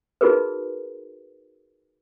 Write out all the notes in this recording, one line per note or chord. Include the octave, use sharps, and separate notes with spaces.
D#4 F4 F#4 G#4 A#4 B4